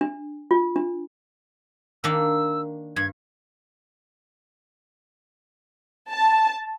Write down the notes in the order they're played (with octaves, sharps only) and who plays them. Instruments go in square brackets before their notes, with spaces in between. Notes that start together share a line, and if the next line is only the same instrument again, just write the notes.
[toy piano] D4
F4
D4
[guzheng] D#3 A#3 D4 [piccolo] E6
[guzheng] G2 [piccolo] G#6
[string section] A5